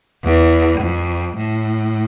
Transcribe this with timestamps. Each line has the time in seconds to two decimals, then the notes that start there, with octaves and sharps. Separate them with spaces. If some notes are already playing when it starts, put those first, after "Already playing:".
0.24 E2
0.81 F2
1.37 A2